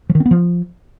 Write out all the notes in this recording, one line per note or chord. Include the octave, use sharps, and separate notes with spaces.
F3
D#3
C4
B3
F3